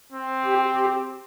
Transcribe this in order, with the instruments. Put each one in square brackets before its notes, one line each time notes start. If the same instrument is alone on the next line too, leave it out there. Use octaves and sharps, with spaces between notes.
[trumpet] C4
[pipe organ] G4
G4